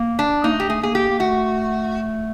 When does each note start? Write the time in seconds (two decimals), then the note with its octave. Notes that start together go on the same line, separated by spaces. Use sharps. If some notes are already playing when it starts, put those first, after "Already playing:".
Already playing: A#3
0.19 D4
0.44 A#3 D#4
0.52 A3
0.60 G4
0.68 A3 G#4
0.82 A#3 G#4
0.95 G4
1.10 A#3
1.20 A3 F#4